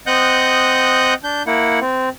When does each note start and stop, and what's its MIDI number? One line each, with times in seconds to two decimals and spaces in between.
0.07 1.14 60
0.07 1.14 75
0.07 1.14 78
0.07 1.14 87
0.07 1.14 90
0.07 1.14 91
1.24 1.43 62
1.24 1.43 91
1.47 1.79 58
1.47 1.79 64
1.47 1.79 78
1.81 2.09 60